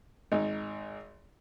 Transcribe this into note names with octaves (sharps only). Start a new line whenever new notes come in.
G#1 D#4